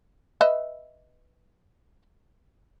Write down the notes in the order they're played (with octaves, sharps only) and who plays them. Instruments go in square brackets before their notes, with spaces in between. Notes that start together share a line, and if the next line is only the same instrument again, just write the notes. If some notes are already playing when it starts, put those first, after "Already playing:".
[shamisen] B4 D#5 E5